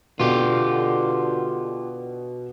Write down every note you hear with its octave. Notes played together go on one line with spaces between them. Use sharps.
B2 D3 F4 G4